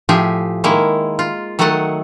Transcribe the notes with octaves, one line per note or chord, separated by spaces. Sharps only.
A2 F3 G4 G#4 E5
D#3 G#3 A#3 E4
F4
D#3 F#3 A3 A4 D#5 F#5